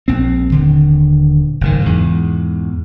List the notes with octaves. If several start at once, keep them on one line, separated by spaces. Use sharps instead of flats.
A#1 C4
D#1 D3
F#1 G#2 D#3
E2 G#2